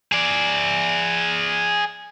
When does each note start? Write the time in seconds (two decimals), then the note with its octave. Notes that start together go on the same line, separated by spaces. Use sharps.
0.12 G#4 D5